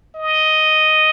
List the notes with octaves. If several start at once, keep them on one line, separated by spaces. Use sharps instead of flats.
D#5